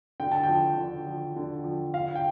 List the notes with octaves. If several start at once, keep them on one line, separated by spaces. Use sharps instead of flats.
D3 G5
A5
G5
F3
D3
F3
D3
F3
D3 F5
G5